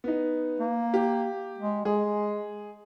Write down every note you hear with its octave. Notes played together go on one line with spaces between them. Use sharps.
B3 D#4
A#3
G4
G#3
G#3 G#4